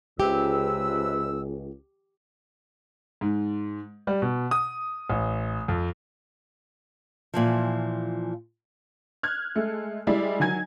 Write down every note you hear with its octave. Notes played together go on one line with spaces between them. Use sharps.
C#2 C3 G4 B4 E6
G#2
G3
B2
D#6
A1
F2
A#2 E3 F3
F6 F#6 G#6
G#3 A3
G3 G#3 E4 G4 D5
D#3 F#3 G#5 G#6